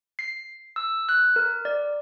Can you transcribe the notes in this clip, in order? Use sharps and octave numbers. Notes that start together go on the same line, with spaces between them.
C7
E6
F#6
A#4
D5